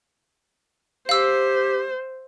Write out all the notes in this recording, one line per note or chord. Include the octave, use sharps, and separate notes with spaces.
G4 C5 F5 E6